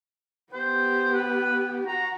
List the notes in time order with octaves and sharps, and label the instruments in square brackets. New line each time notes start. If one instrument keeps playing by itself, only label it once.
[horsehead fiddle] B3 G4 [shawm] C5
[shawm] B4
[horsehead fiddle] F#4 F#5 [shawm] A#5